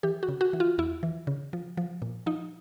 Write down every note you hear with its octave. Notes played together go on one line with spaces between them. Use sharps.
E3 G4
F#4
C#3
F#4
E3
F4
E2 E4
E3
C#3
F3
F3
A#2
F3 D#4